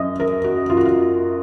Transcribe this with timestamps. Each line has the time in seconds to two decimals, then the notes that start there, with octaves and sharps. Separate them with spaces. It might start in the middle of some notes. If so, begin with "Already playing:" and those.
Already playing: F#2 D#5 E5
0.20 A#4
0.44 F#4
0.70 F4
0.77 F#4
0.85 F4